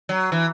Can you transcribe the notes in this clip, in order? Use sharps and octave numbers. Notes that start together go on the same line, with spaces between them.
F#3
E3